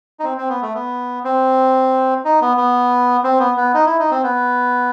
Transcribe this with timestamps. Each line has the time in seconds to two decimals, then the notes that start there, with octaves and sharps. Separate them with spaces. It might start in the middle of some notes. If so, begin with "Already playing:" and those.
0.20 D#4
0.24 C4
0.38 C4
0.49 B3
0.62 A3
0.75 B3
1.24 C4
2.25 D#4
2.41 B3
2.57 B3
3.24 C4
3.40 B3
3.57 B3
3.74 D#4
3.86 E4
3.99 D#4
4.11 C4
4.24 B3